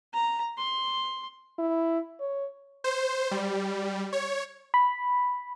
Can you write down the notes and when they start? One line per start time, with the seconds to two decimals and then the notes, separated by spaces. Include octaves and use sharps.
0.14 A#5
0.57 C6
1.59 E4
2.20 C#5
2.84 C5
3.31 G3
4.13 C#5
4.74 B5